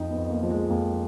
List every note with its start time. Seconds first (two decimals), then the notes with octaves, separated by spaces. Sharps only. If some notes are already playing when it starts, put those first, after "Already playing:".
Already playing: F2 D#4
0.11 B3
0.17 F2
0.30 A#3
0.43 F3
0.50 G#3
0.69 F2 A#3